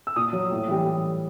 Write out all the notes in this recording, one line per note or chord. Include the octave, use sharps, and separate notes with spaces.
E6
A#2 D#6
F#3
A2
E3 G3